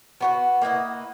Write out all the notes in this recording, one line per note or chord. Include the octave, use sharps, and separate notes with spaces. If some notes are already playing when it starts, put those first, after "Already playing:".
B3 F#4 B4
A#3 E4 B4 D#5